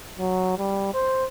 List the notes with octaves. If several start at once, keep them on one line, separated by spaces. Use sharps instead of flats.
F#3
G3
C5